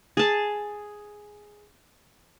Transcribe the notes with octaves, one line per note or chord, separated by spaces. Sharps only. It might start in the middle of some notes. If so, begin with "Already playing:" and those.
G#4 A5